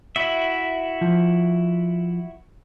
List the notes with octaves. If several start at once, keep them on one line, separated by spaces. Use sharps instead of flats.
E4 F#4 E5
F3